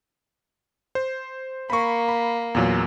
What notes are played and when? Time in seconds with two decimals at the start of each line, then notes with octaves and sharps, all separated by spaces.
0.95 C5
1.70 A#3 B5 C#6
2.08 B5
2.55 E2 A#2 F#3